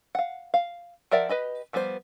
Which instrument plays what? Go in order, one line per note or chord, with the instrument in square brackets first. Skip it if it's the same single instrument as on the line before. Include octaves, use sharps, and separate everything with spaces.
[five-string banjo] F5 F#5
F5
F3 A#4 D5 E5 F#5
G4 B4 D#5 B5
F3 G3 B3 G#4 C5